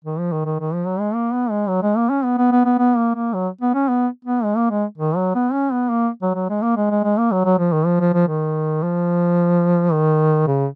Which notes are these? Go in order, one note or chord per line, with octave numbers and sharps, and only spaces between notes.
D#3
F3
D#3
D#3
D#3
F3
F#3
G#3
A#3
B3
G#3
F#3
G#3
A#3
C#4
B3
B3
B3
B3
B3
A#3
A#3
F#3
B3
C#4
B3
B3
G#3
A#3
G#3
D#3
F#3
B3
C#4
B3
A#3
F#3
F#3
G#3
A#3
G#3
G#3
G#3
A#3
F#3
F#3
F3
D#3
F3
F3
F3
D#3
F3
D#3
C#3